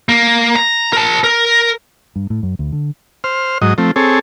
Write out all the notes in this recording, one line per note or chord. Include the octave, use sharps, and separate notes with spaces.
A#3
A#5
A#4 A5
A#4
G2
A2
F#2
D2
D3
C5 F6
G#2 F#3 D#5
F3 A3 C4
C4 G#4 A4 C#5